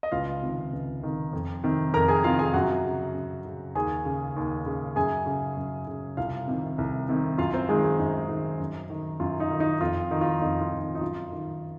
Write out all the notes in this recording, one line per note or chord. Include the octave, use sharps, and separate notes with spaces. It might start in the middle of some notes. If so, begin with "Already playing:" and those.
D#5
C#2 F4 F5
C3 D#3
C#2
C3 D#3
F2
C3 D#3
F2 A#4 A#5
G#4 G#5
C3 D#3 F4 F5
G#4 G#5
F#2 F#4 F#5
C#3
F#2
C#3
D#2 G#4 G#5
C#3
D#2
C#3
F#2 G#4 G#5
C#3
F#2
C#3
C2 F4 F5
C3 D#3
C2
C3 D#3
F#2 F4 F5
C4 C5
D#3 G#3 G#4
G#3 G#4
F#2 D#4
D#3
F#2
D#3
F#2 F4
D#4
D#3
D#4
F2 F4
D#3 D#4
F4
F2 D#4
F4
D#3
D#4
D#4
F#2 F4
D#3